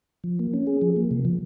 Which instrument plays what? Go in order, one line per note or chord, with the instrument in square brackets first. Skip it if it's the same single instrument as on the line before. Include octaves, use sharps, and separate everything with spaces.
[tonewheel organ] F3
A#3
C#4
G#4
F3
A#3
C3
F3